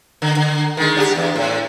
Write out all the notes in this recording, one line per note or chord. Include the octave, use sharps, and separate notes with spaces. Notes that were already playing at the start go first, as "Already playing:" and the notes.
D3
D3
D#3 G#3
D4 F#4 G4
E2
A2